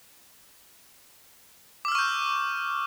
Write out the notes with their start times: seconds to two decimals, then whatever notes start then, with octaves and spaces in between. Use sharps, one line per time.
1.85 D6
1.88 E6
1.92 F6
1.95 C#6
1.99 G6